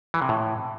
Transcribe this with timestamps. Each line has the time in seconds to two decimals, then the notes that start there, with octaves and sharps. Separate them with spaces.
0.14 E3
0.22 C3
0.29 A2